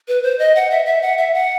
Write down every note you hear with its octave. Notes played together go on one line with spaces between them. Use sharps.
B4
C5
D#5
F#5
E5
E5
F#5
E5
F#5